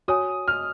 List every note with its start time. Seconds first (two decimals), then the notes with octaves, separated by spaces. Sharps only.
0.08 F#4 C#5 G#5 D#6
0.48 F6